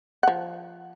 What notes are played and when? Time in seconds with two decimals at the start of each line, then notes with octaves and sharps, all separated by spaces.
0.23 F3 F#5